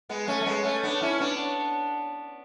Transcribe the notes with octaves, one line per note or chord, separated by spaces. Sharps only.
G#3 B3
A3 C#4
A3
G#3 B3
A3 C#4
B3 D4
C#4 E4
B3 D4